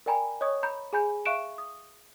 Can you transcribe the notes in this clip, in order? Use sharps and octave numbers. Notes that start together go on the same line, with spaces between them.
A#4 D5 G5 G#5 A#5 B5
C#5 D#5 C#6 D#6 G#6
A#5 B5 G6
G#4 G#5 B5 G6
E5 F5 C#6 F#6 D7 E7
D#6